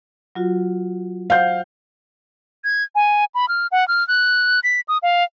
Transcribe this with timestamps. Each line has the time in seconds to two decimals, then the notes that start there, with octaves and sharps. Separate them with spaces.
0.35 F#3 F4 F#4
1.30 C5 F5 F#5 G6
2.64 G#6
2.95 G#5
3.35 B5
3.48 F6
3.72 F#5
3.88 F6
4.08 F#6
4.64 B6
4.88 D#6
5.03 F5